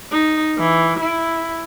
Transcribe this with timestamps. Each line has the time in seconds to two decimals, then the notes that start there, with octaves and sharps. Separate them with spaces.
0.12 D#4
0.58 E3
1.00 E4